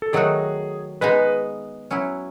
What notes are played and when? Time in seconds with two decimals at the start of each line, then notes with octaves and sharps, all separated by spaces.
0.02 A4
0.13 D#3 F#3 A3 D#4 F#4 G#4
1.01 G#3 B3 D#4 B4
1.91 F#3 C#4 E4